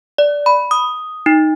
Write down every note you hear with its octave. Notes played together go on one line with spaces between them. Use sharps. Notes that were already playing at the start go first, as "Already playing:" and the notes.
D5
B5
D#6
D#4